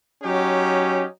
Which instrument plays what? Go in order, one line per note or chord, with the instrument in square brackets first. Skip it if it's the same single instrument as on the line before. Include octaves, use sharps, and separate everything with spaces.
[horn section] F#3 C#4 D#4 G4